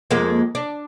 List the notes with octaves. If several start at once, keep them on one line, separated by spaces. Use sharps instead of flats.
F2 G#3 A#3
D4